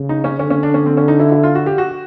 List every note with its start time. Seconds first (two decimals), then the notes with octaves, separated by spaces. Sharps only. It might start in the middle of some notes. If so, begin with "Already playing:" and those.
Already playing: C#3
0.09 D#4
0.24 C#4
0.39 D3 C#4
0.50 C#4
0.63 D4
0.74 C#4
0.86 C4
0.97 C#4
1.08 D#4
1.20 E4
1.32 E4
1.43 F4
1.55 F#4
1.66 G4
1.78 F#4